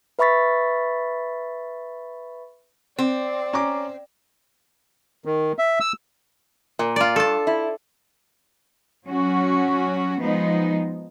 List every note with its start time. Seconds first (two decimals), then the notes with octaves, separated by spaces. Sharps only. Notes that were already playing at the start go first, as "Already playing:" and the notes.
0.19 B4 E5 B5 C#6 A6 B6
2.98 C4 D5
3.53 C#4 A#5 D6
5.25 D#3
5.59 E5
5.80 E6
6.79 A#2
6.96 F4 D5
7.16 G2 A4 A5
7.47 E4
9.06 F#3 C#4 F#4
10.20 F3 G#3 B3 D#4